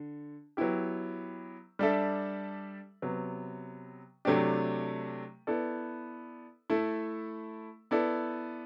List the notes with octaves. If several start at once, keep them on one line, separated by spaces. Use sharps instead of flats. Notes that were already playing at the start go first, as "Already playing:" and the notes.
Already playing: D3
F#3 B3 E4 G4
G3 D4 A4 E5
C3 F#3 B3
C3 F#3 A3 D4 G4
B3 E4 A4 D5
A3 E4 A4
B3 E4 A4 D5